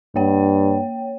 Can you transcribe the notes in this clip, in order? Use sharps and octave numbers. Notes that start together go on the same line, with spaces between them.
G2 A#3 C#5 G5